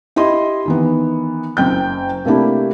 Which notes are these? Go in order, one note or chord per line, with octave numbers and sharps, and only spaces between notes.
E4 G4 D#5 C6
D#3 E3 B3
F#1 F#2 G5 G6
C3 A3 A#3 D4 E4 G4